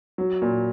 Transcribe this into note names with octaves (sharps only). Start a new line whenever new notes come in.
F#3
A#2